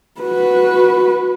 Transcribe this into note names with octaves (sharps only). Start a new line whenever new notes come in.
F#4 B4